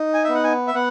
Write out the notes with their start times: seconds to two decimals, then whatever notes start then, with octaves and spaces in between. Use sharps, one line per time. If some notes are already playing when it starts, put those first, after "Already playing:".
Already playing: D#4
0.14 G#5
0.24 E5
0.29 B3
0.34 F#5
0.44 G#5
0.68 E5
0.74 B3 F#5